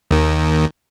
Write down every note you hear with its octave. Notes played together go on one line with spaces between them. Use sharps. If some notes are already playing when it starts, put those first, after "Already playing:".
D#2 D#3